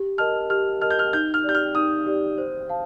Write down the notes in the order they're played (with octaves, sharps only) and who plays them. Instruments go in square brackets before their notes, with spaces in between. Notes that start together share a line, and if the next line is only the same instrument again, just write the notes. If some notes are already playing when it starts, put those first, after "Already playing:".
Already playing: [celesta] G4
[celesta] A#4 D#5 A5 [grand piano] F6
[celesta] G4 [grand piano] F6
[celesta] A#4 D#5 A5 [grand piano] F6
[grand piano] G6
F6
[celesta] D#4 [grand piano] G6
[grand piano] F6
[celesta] G4 D5 [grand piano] G6
[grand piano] F6
[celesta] D#4 [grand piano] D#6
[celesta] G4 D5
C5
F5 A5